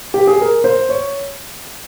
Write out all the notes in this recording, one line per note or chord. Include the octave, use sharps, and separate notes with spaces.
G4
G#4
A#4
C5
C#5